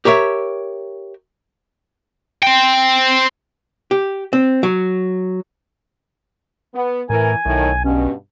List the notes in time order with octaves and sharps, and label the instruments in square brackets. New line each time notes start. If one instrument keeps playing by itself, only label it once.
[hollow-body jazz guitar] G4 A#4 C#5 E5
[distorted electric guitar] C5 G5
[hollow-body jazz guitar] G4
C4
F#3
[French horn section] B3
[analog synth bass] A2 [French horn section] E3 A#4 [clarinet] G#5
[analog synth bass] B1 [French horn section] A2 D#3
[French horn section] G2 B2 [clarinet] C#4